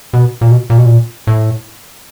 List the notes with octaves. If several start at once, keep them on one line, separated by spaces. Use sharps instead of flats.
B2
A#2
B2
A#2
B2
A#2
A2